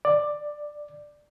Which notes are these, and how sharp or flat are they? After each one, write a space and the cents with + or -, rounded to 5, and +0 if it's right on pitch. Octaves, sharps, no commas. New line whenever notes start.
D5 +10